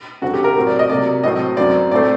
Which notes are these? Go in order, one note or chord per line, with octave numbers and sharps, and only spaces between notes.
F#2 D3 F#3 C4 F#4
G4
A#4
A2 F#3 C4
D5
D#5
C3 F#3 A#3 D5
A2 F#3 C4 D#5
F#2 F#3 C4 D5
A2 A3 C4 D5